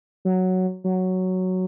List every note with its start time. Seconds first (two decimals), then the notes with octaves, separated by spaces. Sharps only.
0.25 F#3
0.84 F#3